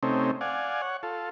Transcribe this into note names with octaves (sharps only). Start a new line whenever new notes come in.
C3 A3 C4 C#4 D#4
D5 F5 F#5 G#5
C#5 F#5
F4 A4